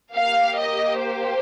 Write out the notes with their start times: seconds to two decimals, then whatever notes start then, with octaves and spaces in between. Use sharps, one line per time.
0.14 A#3 G4 F5
0.57 D#5
0.99 C5